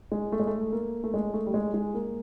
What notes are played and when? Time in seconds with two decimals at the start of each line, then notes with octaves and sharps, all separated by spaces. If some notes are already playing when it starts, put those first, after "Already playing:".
0.11 G#3
0.32 A3
0.40 G#3
0.47 A3
0.72 A#3
1.04 A3
1.14 G#3
1.34 A3
1.46 G3
1.54 G#3
1.74 G#3
1.94 A#3